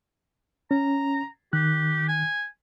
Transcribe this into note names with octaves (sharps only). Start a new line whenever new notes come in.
C#4 A#5
D#3 G4 F#6
G#5